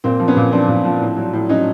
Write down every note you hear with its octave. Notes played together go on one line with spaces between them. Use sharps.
A#2 A#3 C4
F3
B3 C#4
A#2
F3 C4 D4
A#2
F3
A2
F#3
A2
F#3 C#4 D#4